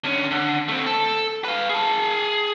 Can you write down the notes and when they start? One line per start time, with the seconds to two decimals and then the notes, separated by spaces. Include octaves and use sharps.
0.04 D3 C#4
0.31 D3
0.68 A3 C4
0.86 A4
1.44 B4 F5
1.69 G#4 A5